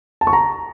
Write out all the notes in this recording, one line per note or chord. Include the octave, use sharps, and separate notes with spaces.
A5
C#6
A#5